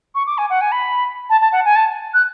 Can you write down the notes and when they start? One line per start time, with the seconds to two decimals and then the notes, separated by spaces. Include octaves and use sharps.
0.15 C#6
0.27 D6
0.38 G#5
0.50 F#5
0.61 G#5
0.72 B5
1.30 A5
1.41 A5
1.52 F#5
1.65 G#5
1.76 A5
2.14 F#6